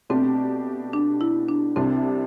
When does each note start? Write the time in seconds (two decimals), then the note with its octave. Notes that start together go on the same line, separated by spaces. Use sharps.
0.10 B2 A3 C4 D4 G4
0.93 D4
1.21 E4
1.49 D4
1.76 C2 C3 G3 C4 D4